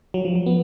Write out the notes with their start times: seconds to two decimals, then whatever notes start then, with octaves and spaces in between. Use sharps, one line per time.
0.14 F#3
0.25 F3
0.35 F#3
0.46 B3